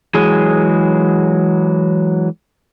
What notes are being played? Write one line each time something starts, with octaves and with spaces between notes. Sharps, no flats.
E3 F#3 G#3 G#4